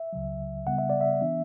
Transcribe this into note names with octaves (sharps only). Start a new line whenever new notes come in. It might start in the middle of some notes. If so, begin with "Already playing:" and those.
Already playing: E5
C#2 C#3 F#3
C#3 G3 B3 F#5
E5
D5
E5
E3 B3 D4